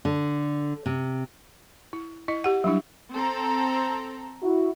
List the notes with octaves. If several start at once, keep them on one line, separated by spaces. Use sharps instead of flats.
D3
C3
E4
E4 D#5
G4 F#5
F#3 G3 D4 E4
C4 A4 A#5
E4 F#4